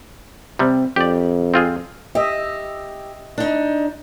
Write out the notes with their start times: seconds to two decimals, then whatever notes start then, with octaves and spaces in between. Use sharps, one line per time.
0.59 C3 G3 C4
0.96 F2 G4 D5
1.54 C4 F4 G#4
2.15 G4 D#5 E5
3.38 D4 D#4